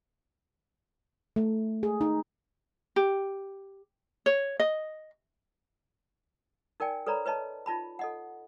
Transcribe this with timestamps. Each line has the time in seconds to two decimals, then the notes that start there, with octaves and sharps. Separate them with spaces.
1.36 A3
1.83 G#4
2.01 D#4
2.96 G4
4.26 C#5
4.60 D#5
6.80 D#4 A#4 D5 G5 G#5
7.06 A4 B4 C#5 D5 A#5 B5
7.26 B4 C#5 D#5 A5
7.66 D#4 F4 A5 B5
7.99 A4 D#5 F#5